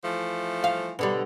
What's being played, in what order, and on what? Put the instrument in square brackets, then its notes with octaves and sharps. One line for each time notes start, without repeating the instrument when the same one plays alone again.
[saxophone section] E3 F3 A3
[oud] F5
B2 D3 G3